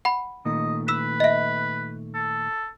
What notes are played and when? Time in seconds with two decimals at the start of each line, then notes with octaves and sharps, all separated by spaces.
0.05 F#5 B5
0.45 A#2 D#3 A3 D#5
0.88 B4 E6 B6 E7
1.20 D#5 E5
2.14 A4